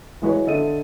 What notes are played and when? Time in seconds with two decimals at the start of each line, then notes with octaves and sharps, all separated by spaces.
0.22 E3 G#3 F#4 B4 C#5
0.47 D3 A4 D#5 E5 D#7